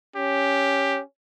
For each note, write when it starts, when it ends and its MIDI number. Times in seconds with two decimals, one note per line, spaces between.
0.16 1.03 61
0.16 1.00 67